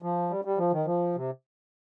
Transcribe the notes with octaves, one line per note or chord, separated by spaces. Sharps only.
F3
G3
G3
F3
D#3
F3
C3